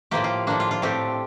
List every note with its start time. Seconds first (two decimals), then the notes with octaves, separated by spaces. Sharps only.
0.11 A2 F3 A#3 G4
0.24 F4
0.47 A2 F3 A#3 D4
0.60 F4
0.71 F4
0.82 A2 A3 C4 G4